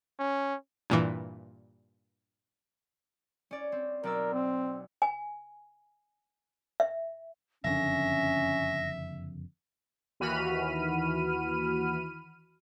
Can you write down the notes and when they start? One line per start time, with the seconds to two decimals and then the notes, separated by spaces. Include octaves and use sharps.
0.19 C#4
0.90 G2 A#2 E3
3.51 C#4 D5
3.72 C4
4.03 B1 A#4 D5 E6
4.33 C4
5.02 G#5
6.80 E5
7.64 F#1 F2 D3 C#4 E5 A#6
10.20 D#2 E3 F#4 B5 F6 D#7